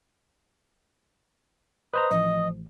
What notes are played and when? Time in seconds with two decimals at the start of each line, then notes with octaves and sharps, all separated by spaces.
1.94 B4 C5 D#5 A#5 D#6
2.11 A1 F3 D#5